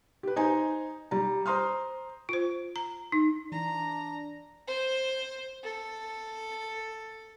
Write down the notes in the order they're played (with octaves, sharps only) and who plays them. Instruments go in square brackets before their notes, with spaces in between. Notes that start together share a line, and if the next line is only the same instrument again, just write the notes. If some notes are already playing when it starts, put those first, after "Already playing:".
[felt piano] G4 B4
D#4 C5 G#5 A#5
G3 A#5
C5 A#5 C6 D#6 F6
[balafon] F4 C5
A#5
D#4
[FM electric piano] E3 [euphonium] D4 [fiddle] A#5
[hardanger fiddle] C5
A4